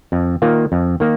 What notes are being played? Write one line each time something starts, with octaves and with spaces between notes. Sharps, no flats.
F2
D#3 A#3 F4
F2
D#3 A#3